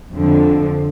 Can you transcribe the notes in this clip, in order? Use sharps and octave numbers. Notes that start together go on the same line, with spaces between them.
F2 D3 F3